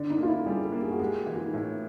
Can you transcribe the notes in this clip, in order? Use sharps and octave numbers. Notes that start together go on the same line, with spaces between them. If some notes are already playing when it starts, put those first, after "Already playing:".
Already playing: D3 D4
D#4
A#3 F4
E4
G3 G#4
A4
A#3
G#4
F#4
G#3 G4
F#4
E3
F4
D#4
A2 E4